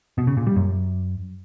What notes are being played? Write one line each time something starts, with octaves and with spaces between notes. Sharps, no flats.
B2
C#3
A#2
G3
F#2